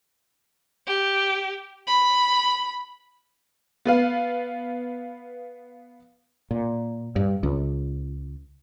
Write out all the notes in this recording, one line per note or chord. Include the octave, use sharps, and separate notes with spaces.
G4
B5
B3 B4 F5
A#2
G2
C#2